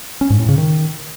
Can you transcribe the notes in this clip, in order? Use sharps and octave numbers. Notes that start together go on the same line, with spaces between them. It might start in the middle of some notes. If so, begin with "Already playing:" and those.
C#4
G#2
A2
C#3
D#3